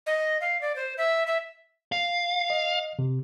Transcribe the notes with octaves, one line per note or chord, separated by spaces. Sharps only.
D#5
F5
D5
C5
E5
E5
F5
D#5
C3